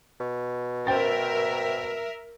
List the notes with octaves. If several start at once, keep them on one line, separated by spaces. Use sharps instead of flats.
B2
A#4 C5 E5 G5 A6